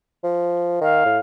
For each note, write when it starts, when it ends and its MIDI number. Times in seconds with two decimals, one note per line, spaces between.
0.24 0.77 53
0.81 1.04 51
0.81 1.19 77
1.05 1.19 45